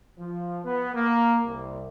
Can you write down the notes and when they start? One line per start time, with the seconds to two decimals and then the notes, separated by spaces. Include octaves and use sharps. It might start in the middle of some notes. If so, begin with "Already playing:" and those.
0.19 F3
0.65 B3
0.94 A#3
1.46 C2